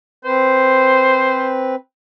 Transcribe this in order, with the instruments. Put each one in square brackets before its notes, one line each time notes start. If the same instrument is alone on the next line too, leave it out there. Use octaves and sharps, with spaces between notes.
[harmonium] C4 B4 [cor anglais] C5